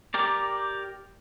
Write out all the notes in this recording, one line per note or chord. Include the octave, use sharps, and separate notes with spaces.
G4 A#4 D5